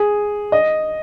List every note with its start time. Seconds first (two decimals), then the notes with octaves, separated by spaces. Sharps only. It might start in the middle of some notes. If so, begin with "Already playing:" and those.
Already playing: G#4
0.52 D#5